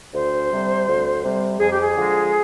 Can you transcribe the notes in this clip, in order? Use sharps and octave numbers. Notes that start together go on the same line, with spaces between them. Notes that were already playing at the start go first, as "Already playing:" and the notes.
D2 C5
C3 G3
D2
C3 G3
F2 G#4
G4
G#4
D3 F3 G#3